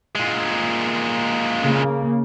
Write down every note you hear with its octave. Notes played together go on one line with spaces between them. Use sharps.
A#2 G#3
C#3 A#3